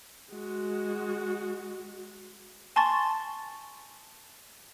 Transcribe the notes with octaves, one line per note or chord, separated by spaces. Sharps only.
G#3 F#4
G#5 A5 C6 C#6 A6